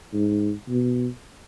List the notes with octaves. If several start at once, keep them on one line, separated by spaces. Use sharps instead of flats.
G#2
B2